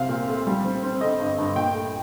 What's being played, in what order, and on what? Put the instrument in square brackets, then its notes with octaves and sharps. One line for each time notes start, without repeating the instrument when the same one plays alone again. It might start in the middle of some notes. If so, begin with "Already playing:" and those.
Already playing: [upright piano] C2 C4 F5
A#2
A3
G3
C4
C4
D3 D#5
G2
G2
A#2 G5
A3